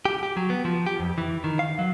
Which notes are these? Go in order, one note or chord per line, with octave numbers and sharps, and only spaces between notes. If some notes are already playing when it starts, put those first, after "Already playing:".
G4
G4
F#3
B3
F3
G4
F2
E3
D#3
F5
F#3